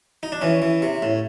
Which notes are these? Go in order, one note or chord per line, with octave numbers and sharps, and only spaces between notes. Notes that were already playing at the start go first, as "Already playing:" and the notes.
D#4
D4
E3 C#4
E3
C3
A2